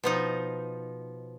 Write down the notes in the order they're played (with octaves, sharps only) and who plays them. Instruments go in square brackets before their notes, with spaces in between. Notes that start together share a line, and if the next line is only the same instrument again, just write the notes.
[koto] B2 F3 D#4